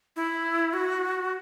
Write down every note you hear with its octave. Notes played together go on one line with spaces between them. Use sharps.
E4
F#4